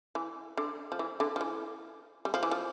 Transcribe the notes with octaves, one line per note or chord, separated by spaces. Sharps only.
E3
D3
F3
E3
D3
F3
E3
G3
F3
E3
F3